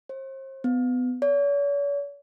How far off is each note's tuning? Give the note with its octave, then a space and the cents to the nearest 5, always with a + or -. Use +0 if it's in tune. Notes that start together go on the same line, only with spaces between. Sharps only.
C5 +40
B3 +25
C#5 +45